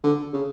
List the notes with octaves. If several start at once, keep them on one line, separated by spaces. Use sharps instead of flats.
D3
C#3